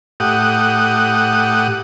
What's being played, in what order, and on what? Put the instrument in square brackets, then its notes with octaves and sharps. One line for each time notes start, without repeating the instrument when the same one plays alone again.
[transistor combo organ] A2 G4 F#5 D#6